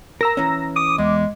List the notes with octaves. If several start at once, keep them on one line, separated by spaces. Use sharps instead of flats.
A#4 A#5 E6 A#6
E3 C#4
D6 D#6
E2 G#3